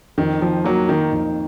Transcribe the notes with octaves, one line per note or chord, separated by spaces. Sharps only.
F2 D#3
D#3 F3
F#3 A#3
D#3 D#4
F2